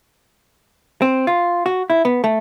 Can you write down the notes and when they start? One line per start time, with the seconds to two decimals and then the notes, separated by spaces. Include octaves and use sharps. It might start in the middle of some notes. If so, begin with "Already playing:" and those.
1.02 C4
1.27 F4
1.66 F#4
1.90 E4
2.05 B3
2.24 A3